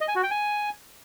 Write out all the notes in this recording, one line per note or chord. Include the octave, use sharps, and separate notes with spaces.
D#5
G#5
F#4
G5
G#5